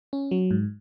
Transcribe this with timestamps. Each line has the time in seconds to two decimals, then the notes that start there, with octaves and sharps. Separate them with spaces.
0.13 C#4
0.31 F#3
0.51 G#2